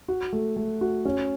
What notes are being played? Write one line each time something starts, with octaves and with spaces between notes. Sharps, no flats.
F#4
A3
A3
F#4
C#4